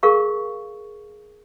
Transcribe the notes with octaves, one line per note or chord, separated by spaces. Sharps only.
G#4 A#4 F5 C#6